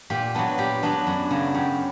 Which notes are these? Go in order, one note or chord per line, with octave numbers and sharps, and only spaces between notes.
A#2 G4
F#3 B3 D4
A#2 G4
F#3 B3 D4
F#2
C#3 F#3
F#2 G4